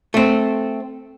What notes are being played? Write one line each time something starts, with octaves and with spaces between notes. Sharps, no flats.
A3 C4